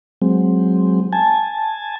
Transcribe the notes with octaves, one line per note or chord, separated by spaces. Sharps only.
F#3 G#3 C4
G#5 A5